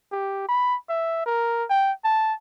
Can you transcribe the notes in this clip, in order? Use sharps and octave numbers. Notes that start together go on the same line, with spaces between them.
G4
B5
E5
A#4
G5
A5